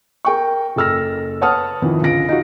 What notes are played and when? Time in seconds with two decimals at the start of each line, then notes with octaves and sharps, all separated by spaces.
0.25 A#4 G5 C#6
0.76 F#1 A4 E6 F6 A#6
1.41 B4 C#5 F#5 A5 D#6 F6
1.82 F2 D#3 E3
2.02 C#2 D3 F4 A#6 D7
2.29 D#4 F4 F#4